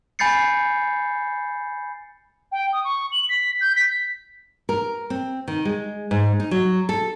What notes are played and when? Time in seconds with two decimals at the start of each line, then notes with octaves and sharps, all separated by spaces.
0.19 G#5 B5 G6 A6 C7 C#7
2.52 G5
2.73 D#6
2.84 C#6
3.12 F#7
3.29 B6
3.61 G6
3.76 B6
4.69 A#4
5.10 C4
5.48 D#3
5.65 G#3
6.11 G#2
6.40 D#4
6.51 F#3
6.89 A4